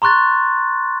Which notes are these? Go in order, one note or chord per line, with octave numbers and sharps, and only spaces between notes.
A#5 C6 C#6 F#6 A6